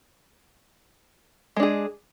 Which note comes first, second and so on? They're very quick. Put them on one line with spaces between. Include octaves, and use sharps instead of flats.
G#3 D4 G#4